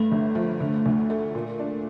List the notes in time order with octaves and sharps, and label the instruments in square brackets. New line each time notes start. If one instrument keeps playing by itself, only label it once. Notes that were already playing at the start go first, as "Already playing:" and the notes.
Already playing: [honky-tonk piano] G2 [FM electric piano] A3
[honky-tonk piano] G1
F3
D3
D2
A3
A#2
D4